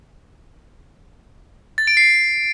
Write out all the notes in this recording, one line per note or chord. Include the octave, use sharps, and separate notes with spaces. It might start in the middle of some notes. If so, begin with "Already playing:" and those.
A6
D7
C7